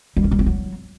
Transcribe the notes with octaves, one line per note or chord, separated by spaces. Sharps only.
G3
C#4
G3
C4
F#3